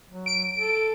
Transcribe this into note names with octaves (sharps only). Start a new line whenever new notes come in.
F#3
D7
A4